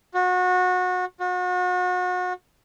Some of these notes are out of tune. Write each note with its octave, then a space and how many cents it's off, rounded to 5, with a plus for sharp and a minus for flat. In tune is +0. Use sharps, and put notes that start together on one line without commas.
F#4 -25
F#4 -35